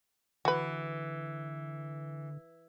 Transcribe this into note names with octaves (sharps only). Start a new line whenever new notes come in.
D3 E3 F#4 B4